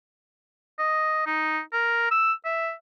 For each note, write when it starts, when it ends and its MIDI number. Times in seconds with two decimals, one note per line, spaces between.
0.79 1.23 75
1.26 1.60 63
1.73 2.07 70
2.11 2.33 88
2.45 2.72 76